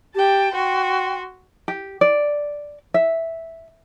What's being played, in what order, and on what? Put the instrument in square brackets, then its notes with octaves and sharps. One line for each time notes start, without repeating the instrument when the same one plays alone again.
[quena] G4 [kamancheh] G5 A5
[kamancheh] F#4 C6 [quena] G5
[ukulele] G4
D5
E5